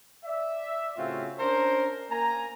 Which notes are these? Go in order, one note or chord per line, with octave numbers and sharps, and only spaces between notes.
D5 E5
A2 C#3 C4 F4 F#4
C#4 D4 A#4 C5
A#3 A#4 G#5 A#5